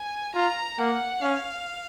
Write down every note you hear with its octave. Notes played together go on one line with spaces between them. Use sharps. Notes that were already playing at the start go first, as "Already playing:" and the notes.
Already playing: G#5
F4 A#5
A#3 F#5
C#4 F5